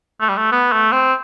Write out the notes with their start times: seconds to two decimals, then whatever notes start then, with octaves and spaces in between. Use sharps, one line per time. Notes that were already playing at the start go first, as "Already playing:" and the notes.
0.21 A3
0.29 G3
0.37 A3
0.51 B3
0.72 A3
0.92 C4